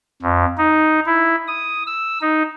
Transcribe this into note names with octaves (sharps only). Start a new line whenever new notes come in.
F2
D#4
E4
D#6
E6
D#4